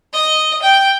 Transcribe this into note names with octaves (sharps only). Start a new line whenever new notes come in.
D#5
G5